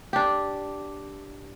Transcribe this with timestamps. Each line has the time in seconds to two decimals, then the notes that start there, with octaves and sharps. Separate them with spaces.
0.13 D4 G4